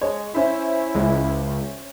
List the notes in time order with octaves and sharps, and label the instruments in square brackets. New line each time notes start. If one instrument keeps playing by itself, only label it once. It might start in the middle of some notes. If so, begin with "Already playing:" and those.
[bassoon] G#3 [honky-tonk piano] C#5
[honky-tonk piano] C#4 C5 E5 [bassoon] E4
[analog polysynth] C#2